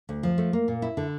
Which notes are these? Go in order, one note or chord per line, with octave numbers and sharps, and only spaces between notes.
D2
F3
A3
A#3
A#2
E4
D3